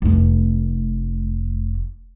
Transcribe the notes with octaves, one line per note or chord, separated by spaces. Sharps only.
F1 A3